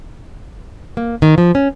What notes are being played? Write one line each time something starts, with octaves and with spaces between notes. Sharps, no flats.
A#3
D#3
F3
C#4